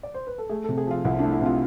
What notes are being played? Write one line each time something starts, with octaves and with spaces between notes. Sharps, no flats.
D5
C5
B4
A4
A3 G#4
A4
C3
G#4
F3 F4
C2 E4
D4
A3
E4
C3 F4